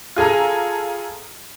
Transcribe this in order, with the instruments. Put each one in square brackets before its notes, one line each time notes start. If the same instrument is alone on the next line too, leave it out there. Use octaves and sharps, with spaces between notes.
[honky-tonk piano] F4 G#4 A4 A#5